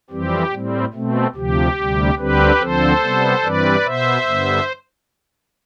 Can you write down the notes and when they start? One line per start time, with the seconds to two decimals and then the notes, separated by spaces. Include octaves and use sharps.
0.10 F2 E3 G3 C4 G4
0.52 A2 G3 C4
0.93 B2 A3 C4
1.35 D2 C3 F3 G4
1.77 D2 C3 G3
2.18 D2 D3 G3 C4 G4 B4
2.60 D2 D3 F3 C4 A4 C5
3.01 C3 G3 B3
3.43 G2 E3 G3 C4 B4 D5
3.84 B2 B3 C5 E5
4.26 G2 D3 G3 B3